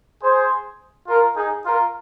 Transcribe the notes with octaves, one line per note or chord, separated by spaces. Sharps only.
G#4 C5
F4 A#4
D#4 G#4
F4 A#4